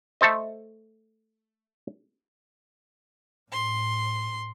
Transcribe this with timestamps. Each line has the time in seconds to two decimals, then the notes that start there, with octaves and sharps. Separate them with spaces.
0.21 A3 A4 C5 D#5
3.52 A2 C6